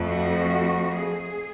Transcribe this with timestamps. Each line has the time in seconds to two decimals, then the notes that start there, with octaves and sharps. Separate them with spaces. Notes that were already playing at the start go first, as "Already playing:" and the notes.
Already playing: F2 F3 A3
0.08 F#4
0.95 G#4